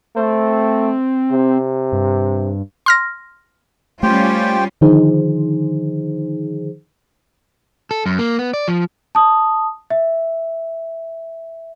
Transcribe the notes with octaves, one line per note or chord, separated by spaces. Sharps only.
A3 C4
C3
G2
C6 F6 A#6
G3 A3 C#4 F4 G4 C5 G5
D3 D#3 F3 D#4 G#4 C5
A4
F#2
A#3
B3
D5
F3
A5 D#6
E5